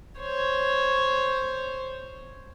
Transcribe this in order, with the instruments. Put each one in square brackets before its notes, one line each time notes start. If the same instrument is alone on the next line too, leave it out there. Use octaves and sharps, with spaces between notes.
[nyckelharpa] C5 C#5